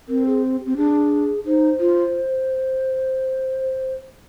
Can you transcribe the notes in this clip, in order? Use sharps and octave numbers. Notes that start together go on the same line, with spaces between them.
C4 A#4
G#4
G4
C4
D4 G#4
D#4 C5
F4